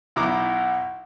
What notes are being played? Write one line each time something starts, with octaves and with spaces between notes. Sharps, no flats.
B1 B2 E4 A#5 D6